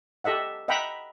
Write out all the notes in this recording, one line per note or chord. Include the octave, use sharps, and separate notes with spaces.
G4 A4 D#5 E5 F#5
D#5 E5 F#5 G5 A#5 B5